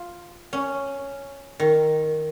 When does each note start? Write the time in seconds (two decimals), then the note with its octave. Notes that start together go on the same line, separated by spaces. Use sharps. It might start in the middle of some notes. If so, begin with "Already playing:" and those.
Already playing: F4
0.53 C#4
1.60 D#3